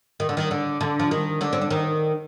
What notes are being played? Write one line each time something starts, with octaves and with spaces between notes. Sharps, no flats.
D#3
D3
D#3
D3
D3
F3
D#3
D3 D4
C4
D4
D#3 D#4